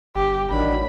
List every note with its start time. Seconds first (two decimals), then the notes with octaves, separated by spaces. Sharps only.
0.16 G1 G4
0.50 A1 D#3 F#3 D4 B5